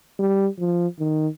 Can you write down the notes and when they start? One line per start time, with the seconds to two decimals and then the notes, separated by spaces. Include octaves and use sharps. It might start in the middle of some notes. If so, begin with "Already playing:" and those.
0.19 G3
0.59 F3
1.00 D#3